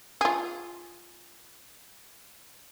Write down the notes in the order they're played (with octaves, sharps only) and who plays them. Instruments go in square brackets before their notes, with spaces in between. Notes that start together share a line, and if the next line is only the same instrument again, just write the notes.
[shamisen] F4 G#4